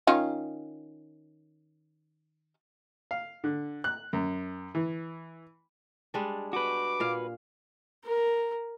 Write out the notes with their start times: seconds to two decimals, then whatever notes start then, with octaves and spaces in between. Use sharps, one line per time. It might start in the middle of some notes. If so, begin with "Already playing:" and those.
0.07 D#3 C#4 F4
3.11 F5
3.44 D3
3.84 F#6
4.13 F#2
4.75 E3
6.14 G3 G#3 D4
6.53 F#4 B4 D6
7.00 A#2 F5
8.05 A#4